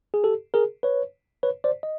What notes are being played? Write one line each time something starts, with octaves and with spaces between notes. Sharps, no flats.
G#4
G4 A4
G#4 A#4
B4 C#5
B4 C#5
C5 D5
D#5